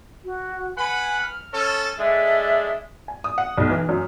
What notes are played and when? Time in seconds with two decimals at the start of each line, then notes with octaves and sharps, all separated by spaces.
0.25 F#4
0.77 B4 F#5 G#5 B5
1.22 F6
1.53 C#4 A4
1.99 G#3 D4 A4 E5
3.08 G#5
3.24 D#6
3.38 F#5
3.58 B1
3.70 E3
3.89 F#2